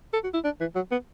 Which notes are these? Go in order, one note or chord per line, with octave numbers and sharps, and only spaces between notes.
A4
F#4
E4
D4
E3
F#3
B3